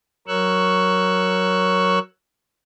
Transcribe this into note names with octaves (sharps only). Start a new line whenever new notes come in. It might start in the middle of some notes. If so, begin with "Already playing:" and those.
F#3 A#4 C#5 C#6 E6 F#6